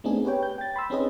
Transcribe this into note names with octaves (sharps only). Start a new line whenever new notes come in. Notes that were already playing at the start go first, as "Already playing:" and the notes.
A3 B3 C4 D4 D#4 G#4
G4 B4 C#5 G5
G6
G5 A6
B5 C6 E6
C4 C#4 D#4 G#4 B4 D#5